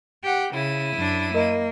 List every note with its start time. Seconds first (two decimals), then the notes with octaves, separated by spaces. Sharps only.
0.24 G4 F#5 G5
0.54 C#3 E4 D#7
0.97 F#2 D4
1.35 A#3 A#4 D#5